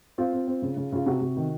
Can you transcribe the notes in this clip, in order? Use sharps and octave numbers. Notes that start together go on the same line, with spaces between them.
C4 F4
C4
C4
C#3
C#3
C#3 F4
C3 F#4
C3
D#3